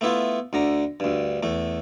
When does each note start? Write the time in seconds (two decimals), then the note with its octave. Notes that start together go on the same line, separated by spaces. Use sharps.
0.01 A3 B3 E4 F4
0.53 D2 D3 A#5
1.00 D2 G2
1.43 E2 A3